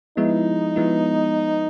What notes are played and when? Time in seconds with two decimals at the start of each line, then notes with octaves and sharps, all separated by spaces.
0.17 F3 G#3 B3 D#4 E4
0.76 F3 G#3 B3 E4